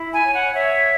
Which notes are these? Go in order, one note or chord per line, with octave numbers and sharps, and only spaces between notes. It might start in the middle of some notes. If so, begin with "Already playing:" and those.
Already playing: E4
G#5
C#5
F#5
C#5 E5